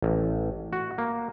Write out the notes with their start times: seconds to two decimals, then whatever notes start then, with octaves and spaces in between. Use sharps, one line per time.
0.02 A1
0.73 F#4
0.98 A#3